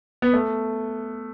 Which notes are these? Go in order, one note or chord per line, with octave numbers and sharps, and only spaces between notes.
B3
A3